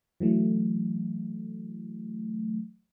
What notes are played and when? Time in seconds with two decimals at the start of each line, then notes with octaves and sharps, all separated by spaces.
0.20 E3 F#3 A3